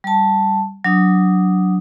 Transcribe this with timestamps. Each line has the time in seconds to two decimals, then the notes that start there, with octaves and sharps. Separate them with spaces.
0.04 G3 A5
0.84 F#3 D4 D#6